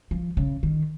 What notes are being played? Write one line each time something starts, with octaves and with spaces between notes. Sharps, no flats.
F3
C#3
D#3